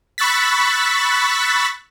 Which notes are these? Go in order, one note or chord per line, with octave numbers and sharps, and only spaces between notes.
B5 C#6 E6 F#6 A6 B6